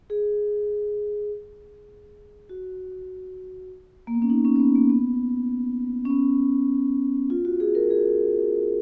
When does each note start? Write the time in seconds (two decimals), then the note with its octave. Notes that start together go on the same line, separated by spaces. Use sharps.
0.10 G#4
2.49 F#4
4.07 A#3
4.15 B3
4.22 C#4
4.30 D#4
4.45 C#4
4.56 C#4
4.60 B3
4.75 A#3
4.90 B3
6.05 C#4
6.10 B3
7.30 F4
7.45 F#4
7.60 G#4
7.75 A#4
7.90 G#4